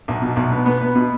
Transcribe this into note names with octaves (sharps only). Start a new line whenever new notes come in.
B1
B2
B1
B3
B3
B3
B2